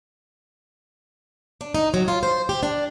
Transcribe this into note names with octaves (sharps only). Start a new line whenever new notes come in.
D4
D#4
F#3
F4
C5
G4
D4